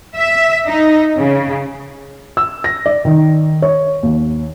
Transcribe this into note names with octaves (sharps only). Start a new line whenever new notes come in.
E5
D#4
C#3
E6
A#6
D5
D#3
C#5
D#2